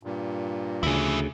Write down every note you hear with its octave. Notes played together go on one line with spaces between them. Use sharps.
G2 A#2
D2 C#3 E4 G#4